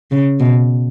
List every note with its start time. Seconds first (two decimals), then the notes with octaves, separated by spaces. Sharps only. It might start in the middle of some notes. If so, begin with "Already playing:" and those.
0.11 C#3
0.40 B2